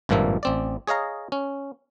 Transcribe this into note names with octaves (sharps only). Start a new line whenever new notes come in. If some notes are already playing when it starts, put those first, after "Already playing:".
G#1 G2 A#2 F3 A#3 E5
A1 C4 D5
G#4 C#5 D#5 F5 A#5
C#4